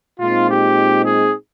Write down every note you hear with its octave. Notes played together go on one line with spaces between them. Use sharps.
A#2 G#3 C4 D#4 F4
G4
G#4